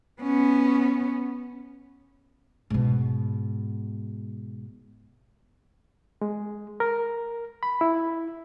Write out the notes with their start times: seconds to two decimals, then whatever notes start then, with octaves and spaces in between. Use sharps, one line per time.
0.22 B3 C#4
2.70 G#2 B2
6.22 G#3
6.80 A#4
7.63 B5
7.81 E4